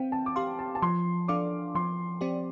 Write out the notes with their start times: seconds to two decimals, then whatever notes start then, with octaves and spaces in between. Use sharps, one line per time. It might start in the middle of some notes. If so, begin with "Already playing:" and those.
Already playing: C4 F5 G5
0.12 A5
0.26 D6
0.36 G4 F5 C6
0.59 A5
0.75 A5
0.82 F3 C6
1.28 D4 A4 D5 F5 D6
1.75 F3 C6
2.21 C4 G4 D5